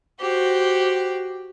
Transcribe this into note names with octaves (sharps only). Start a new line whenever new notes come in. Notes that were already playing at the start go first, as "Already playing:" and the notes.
F#4 G4 C5